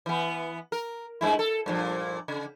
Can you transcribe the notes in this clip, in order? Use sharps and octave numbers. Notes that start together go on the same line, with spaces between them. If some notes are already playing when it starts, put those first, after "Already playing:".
E3 B3
A#4
G2 G#3 E4
A4
G2 A#2 F3
C#3